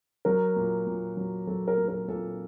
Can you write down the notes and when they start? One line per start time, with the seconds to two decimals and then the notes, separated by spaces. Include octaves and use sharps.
0.25 F#3 A#4
0.56 A#2
0.86 A#2
1.17 F#3
1.47 F#3 A4
1.68 A#4
1.78 A#2
1.88 A#4
2.08 A#2 A4